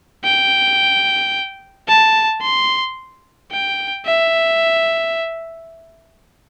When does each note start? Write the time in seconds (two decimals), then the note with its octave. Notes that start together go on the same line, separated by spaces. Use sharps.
0.24 G5
1.88 A5
2.42 C6
3.52 G5
4.06 E5